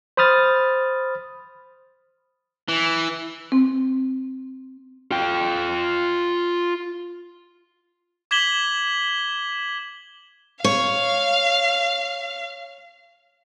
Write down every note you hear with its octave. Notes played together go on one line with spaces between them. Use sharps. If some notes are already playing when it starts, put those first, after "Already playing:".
C5 B5 D#6 F6 A6
E3
C4
F4 G5
D6 G#6 B6 E7 F#7 G7
C#5 F5